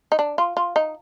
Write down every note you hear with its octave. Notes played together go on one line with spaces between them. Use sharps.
D#4
D4
F4
F4
D#4